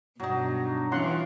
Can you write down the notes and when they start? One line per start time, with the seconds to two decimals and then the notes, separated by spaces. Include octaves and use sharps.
0.20 G2 B2 F#3 D4 D#4
0.92 E3 C#4 F4 F#5 C6